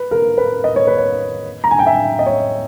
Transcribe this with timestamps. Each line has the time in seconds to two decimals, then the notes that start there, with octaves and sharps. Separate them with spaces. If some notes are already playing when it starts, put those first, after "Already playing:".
Already playing: B4
0.11 A#4
0.38 B4
0.64 D#5
0.76 C#5
0.87 B4
0.98 C#5
1.64 A#5
1.71 G#5
1.79 G5
1.86 E5
2.19 D#5
2.26 C#5